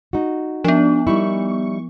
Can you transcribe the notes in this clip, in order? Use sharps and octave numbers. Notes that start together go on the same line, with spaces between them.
D#4 F#4
F3 B3 D4
G3 D#4 E4 C#6